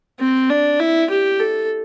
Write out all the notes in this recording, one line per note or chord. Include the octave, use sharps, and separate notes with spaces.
C4
D4
E4
G4
A4